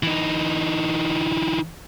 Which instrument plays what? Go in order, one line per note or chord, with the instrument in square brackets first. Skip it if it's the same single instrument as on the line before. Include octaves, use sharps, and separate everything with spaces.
[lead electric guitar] E3 D#4